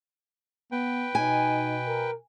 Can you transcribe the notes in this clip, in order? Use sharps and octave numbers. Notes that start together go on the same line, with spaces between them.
B3 B4 G5
B2 D#4 G#5
A#4